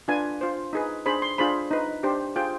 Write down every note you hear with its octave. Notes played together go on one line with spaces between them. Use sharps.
D4 F4 B4 G#5
F4 C5
D#4 G#4 B4
D4 G#4 C5 B5
C6
D4 F4 G#4 C5 B5
D#4 B4
D4 G4 C5
F4 G#4 C5 G5